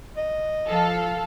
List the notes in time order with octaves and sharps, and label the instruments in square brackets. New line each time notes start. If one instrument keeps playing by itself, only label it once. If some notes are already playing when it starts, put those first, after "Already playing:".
[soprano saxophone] D#5
[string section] F3 A4 F5